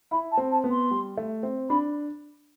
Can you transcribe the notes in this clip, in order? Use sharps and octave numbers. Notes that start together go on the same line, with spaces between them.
E4 B5
A5
C4
A5
B3
C6
G3
A3
C4
D4 B5